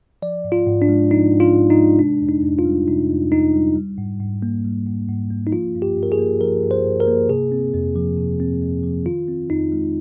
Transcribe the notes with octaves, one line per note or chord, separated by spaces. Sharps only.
F3 D5
G#2
F4
G#2
D4
G#3
F3 D#4
G#2
F4
G#2
D#4
G#3
C3 D4
F2
D#4
F2
F4
G3
C3 D#4
F2
F2 D#4
G3
G3
G#2
G#2
A#3
G3
G#2
G#2
A#3
D#4
F3 F4
G2
G4
G2
A#4
G#4
A#3
F3 A#4
G2
C5
G2
A#4
A#3
C3 G#4
C4
F2
F3
C3
C4
F2
F3
D#3 F4
C4
F2 D#4
G#3